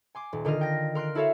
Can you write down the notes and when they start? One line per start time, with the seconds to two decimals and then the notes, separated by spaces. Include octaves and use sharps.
0.15 G#5 C6 D6
0.33 D#1
0.45 D3 D#3 F4 D#5 F6
0.61 G5 A#6
0.95 A#4 C6 F6 F#6 D7
1.15 E4 F#4 A4 C#5 E5 F5